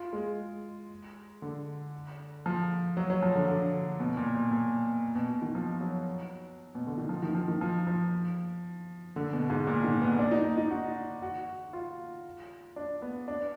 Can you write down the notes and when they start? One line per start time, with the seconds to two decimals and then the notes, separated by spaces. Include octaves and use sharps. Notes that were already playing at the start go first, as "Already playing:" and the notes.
Already playing: F4
0.13 G#3
1.42 D3
2.46 F3
2.97 F#3
3.10 F#3
3.22 F3
3.36 D3
3.48 D3
4.00 B2
4.17 A#2
4.34 A#2
4.51 A#2
5.16 B2
5.29 B2
5.42 D#3
5.55 F3
5.81 F#3
6.75 B2
6.87 D3
6.98 D#3
7.09 F3
7.23 D#3
7.35 F3
7.48 D#3
7.61 F3
7.87 F3
9.16 D3
9.33 B2
9.50 G#2
9.67 A#2
9.84 D#3
10.02 B3
10.19 D4
10.31 D#4
10.44 D#4
10.58 D#4
10.71 F#4
11.22 F#4
11.73 F4
12.76 D4
13.02 B3
13.28 D4